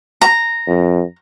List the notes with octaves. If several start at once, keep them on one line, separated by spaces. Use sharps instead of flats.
A#5
F2